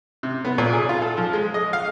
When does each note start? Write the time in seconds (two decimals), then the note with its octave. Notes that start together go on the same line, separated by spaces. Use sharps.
0.23 C3
0.45 B3
0.58 A#2
0.73 G#4
0.89 F4
1.02 A4
1.17 F3
1.33 G#3
1.54 D#5
1.73 F5